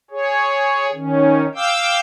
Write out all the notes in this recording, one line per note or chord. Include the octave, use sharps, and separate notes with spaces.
G#4 C#5
D#3 C#4
F5 G5 D6 E6 G6